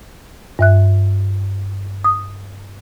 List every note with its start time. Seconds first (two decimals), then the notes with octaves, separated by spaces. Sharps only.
0.59 G2 E5 F#6
2.04 D#6